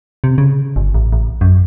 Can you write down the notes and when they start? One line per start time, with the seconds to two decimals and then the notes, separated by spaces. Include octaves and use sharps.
0.24 C3
0.38 C#3
0.76 G1
0.94 A1
1.13 A1
1.41 F#2